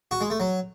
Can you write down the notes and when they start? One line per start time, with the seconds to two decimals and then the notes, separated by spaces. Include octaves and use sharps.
0.11 F#4
0.21 G#3
0.30 A3
0.40 F#3